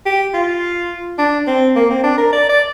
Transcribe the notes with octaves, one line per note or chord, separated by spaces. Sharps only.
G4
F4
D4
C4
A#3
C4
D4
A#4
D5
D5